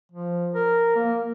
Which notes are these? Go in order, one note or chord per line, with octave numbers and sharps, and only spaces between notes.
F3
A#4
A#3